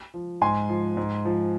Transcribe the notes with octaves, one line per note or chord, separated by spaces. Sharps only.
F3
G#2 G#5 C6
F3
G#2
F3